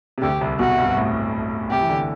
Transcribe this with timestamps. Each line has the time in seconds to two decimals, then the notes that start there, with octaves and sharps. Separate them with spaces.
0.18 C3
0.22 D2 D3 G4
0.41 C2 C3
0.59 B1 B2 F#4
0.78 G2
0.97 A2
1.71 C2 C3 G4
1.81 E3
1.89 D3